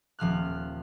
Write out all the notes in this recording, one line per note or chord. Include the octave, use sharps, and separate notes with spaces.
D#1 F3 F6 F#6